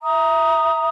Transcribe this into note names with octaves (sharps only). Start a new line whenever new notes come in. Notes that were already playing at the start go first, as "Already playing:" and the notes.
E5 A#5 D#6